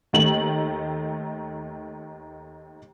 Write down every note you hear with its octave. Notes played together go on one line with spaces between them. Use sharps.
D#2 D#3 A3 F#7